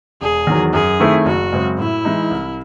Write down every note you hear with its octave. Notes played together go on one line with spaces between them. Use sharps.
E1 G#4
E2 D#3 F#3
F#2 G#4
D#3 A3 C4 E4
F#1 F#4
F#2 C#3 G#3 C4
A2 E4
E3 G#3 D#4
C2